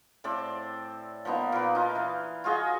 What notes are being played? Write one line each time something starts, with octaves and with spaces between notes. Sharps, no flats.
A2 C4 D5 A5
F3 A#3 B3 D#4
A#2 B4
D#4 F4
E3
F4 F#4 G#4 D#5